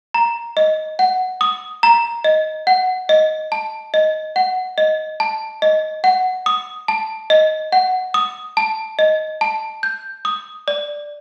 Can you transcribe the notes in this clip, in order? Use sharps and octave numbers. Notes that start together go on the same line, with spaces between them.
A#5
D#5
F#5
D#6
A#5
D#5
F#5
D#5
A5
D#5
F#5
D#5
A5
D#5
F#5
D#6
A5
D#5
F#5
D#6
A5
D#5
A5
G6
D#6
D5